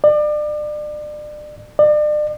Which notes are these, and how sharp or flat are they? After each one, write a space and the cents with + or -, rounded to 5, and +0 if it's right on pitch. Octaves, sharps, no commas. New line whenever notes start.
D5 +35
D5 +40